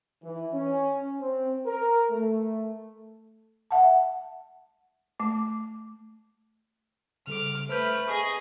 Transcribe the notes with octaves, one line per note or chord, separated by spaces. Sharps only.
E3
C#4
C4
A#4
A3
E5 F#5 A5
A3 D6
C#3 G3 A4 D6 F6
A3 B4 C5 F6 G6
G#4 D#5 C#6 D#6